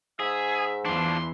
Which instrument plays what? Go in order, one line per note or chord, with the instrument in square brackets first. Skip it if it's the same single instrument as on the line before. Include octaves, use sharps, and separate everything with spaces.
[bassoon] G#2 [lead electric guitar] G#4 [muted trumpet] E5
[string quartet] E2 E3 [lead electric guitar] F3 D4 [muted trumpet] C6